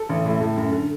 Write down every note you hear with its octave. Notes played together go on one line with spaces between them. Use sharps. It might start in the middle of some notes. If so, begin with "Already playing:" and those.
Already playing: A4
A1
A2
A2
F#2
D3